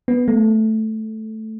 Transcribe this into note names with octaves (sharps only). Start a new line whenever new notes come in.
B3
A3